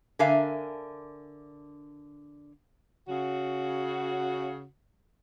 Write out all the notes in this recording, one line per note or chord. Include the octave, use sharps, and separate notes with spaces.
D3 D4 A#4 E5 F5 G#5
C#3 F#4